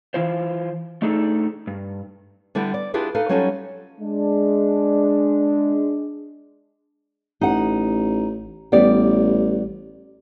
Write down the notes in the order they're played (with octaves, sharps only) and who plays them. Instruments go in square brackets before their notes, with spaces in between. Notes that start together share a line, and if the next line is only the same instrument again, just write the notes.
[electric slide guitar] E3 E4 F4 C5
A3 D4 D#4 G#4 A4
G2
[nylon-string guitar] D3 G3 B3 E4 G4
D5
D4 E4 F4 G4 G#4 B4
D#4 A4 B4 F5
F#3 G3 C#4 D#4 F4 A4
[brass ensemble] G#3 D4
[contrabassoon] A1 [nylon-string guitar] D#4 F#5
[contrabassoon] A1 [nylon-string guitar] G3 B3 D5